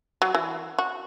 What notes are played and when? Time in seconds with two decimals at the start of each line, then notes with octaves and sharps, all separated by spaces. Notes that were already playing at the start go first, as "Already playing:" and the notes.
0.22 F#3
0.35 E3
0.79 F#4